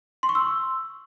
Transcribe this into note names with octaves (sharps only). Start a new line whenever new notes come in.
C6
C#6
E6